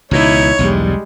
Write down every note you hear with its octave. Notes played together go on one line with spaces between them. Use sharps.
C#2 B2 E3 D#4 E4 C#5
B1 E2 G2 G3 G#3